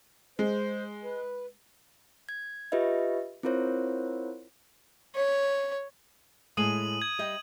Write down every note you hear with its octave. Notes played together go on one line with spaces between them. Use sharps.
G#3 C5
B4
G#6
F4 G4 B4 D#5 E5
C4 E4 F4 A#4 C5 C#5
C#5
A2 G#3 G#5 D#6 D#7 F#7
G#6
G3 D#5 G5